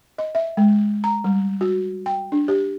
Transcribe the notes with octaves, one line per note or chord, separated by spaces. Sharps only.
D#5
E5
G#3
A#5
G3
F#4
G5
D4
G4